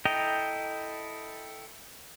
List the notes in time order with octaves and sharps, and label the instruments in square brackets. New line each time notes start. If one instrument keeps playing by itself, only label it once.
[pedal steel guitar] E4 A4 D#5 G5 A#5